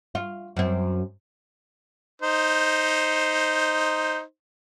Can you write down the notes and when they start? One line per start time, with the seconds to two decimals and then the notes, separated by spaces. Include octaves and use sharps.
0.15 F4
0.57 F#2 C4
2.22 D#4 C5